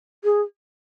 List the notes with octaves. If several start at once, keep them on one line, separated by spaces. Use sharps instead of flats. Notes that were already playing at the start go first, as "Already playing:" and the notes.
G#4